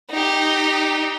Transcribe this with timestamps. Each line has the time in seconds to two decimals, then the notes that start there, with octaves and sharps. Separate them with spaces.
0.10 D#4 G4